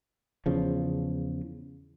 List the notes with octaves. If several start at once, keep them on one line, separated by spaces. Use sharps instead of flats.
E2 C#3 F3